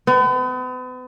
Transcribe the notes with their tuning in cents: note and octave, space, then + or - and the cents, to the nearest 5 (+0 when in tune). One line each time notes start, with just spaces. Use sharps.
B3 +40